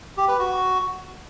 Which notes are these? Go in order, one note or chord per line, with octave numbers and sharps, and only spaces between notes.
G4
B4
F#4